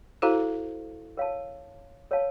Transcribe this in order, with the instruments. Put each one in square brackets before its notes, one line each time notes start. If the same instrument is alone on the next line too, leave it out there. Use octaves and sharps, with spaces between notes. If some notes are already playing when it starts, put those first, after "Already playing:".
[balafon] E4 F#4 [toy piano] A4 C5 F5 A#5
[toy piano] A#4 C#5 F5 A5
A#4 C#5 F5 A5